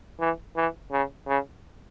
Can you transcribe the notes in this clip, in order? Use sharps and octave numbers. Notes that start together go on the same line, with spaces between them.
E3
E3
C#3
C#3